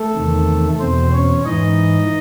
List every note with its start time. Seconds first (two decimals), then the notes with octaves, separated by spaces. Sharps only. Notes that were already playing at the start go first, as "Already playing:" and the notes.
Already playing: A3 A4
0.15 E2 C3 D#3
0.80 E2 B2 C4 C5
1.12 C#4 C#5
1.46 G#2 E3 D#4 D#5